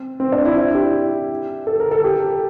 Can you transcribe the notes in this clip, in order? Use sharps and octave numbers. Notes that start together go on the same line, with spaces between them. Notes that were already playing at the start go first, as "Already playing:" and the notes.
Already playing: C4
C4
D4
E4
E4
G4
A4
A#4
A4
G4